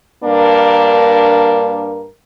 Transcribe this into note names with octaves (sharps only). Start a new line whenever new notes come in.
G2 A#3 D4 A#4